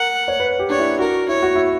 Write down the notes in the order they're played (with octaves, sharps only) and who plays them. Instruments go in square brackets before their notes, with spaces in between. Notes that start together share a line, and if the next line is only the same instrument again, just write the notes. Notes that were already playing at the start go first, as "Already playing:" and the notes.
Already playing: [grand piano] A#4 [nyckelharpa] F#5
[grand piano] C#5
B4
G4
[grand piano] D4 [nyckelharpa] C#5
[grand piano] E4
[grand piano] F#4 [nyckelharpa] A#4
[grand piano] E4 [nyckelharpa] C#5
[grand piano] F#4
E4